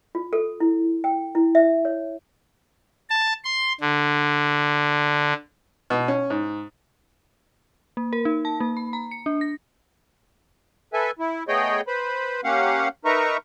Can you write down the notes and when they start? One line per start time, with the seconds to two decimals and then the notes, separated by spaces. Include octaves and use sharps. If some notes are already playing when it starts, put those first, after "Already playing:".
0.15 F4
0.33 A4
0.60 E4
1.04 G5
1.35 E4
1.55 E5
1.85 C#5
3.10 A5
3.44 C6
3.81 D3
5.90 B2
6.08 C#4
6.30 G#2
7.97 A#3
8.13 A#4
8.25 D#4
8.45 A5
8.60 A#3
8.77 B5
8.93 A#5
9.11 C#7
9.26 D4
9.41 A#6
10.93 A4 B4 E5 G#5
11.19 E4
11.48 A3 B3 G#4 C#5 D#5 G5
11.87 B4 C5 B5
12.44 A#3 C#4 G4 F5 F#5
13.05 D#4 A#4 B4 E5 A#5 C#6